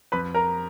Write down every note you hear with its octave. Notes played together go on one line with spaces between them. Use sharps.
F2 B4 B5
A#4 A#5